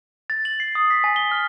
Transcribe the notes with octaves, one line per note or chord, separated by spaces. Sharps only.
A6
F#7
C7
D#6
B6
G#5
G7
F6